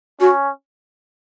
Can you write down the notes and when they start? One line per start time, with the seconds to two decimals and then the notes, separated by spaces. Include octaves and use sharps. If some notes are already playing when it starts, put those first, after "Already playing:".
0.21 C#4 F#4